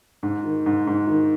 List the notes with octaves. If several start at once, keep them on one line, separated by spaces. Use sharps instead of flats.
G#2
D#3
G#2
G#2
D#3